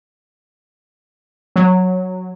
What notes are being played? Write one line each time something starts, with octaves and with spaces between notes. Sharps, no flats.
F#3